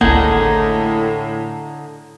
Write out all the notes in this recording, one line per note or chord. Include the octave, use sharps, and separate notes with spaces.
G#1 C#2 A2 D3 A#3 D#4 G#4 F#5